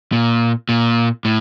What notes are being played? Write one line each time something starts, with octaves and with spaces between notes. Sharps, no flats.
A#2
A#2
A2